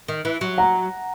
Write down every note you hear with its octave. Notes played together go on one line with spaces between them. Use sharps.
D#3
E3
F#3
F#5 A#5